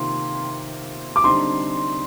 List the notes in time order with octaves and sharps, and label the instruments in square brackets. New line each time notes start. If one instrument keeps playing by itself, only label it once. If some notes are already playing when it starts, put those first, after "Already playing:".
Already playing: [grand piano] C3 D#3 A#3 F4 [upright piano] C6
[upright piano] D6
[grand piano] D3 G3 C4 D#4 [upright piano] C6